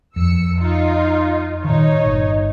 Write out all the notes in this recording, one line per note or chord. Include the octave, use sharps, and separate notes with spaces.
F2 E6 C#7
D#4 F4
A#2 D#3 D#4 C#5
G1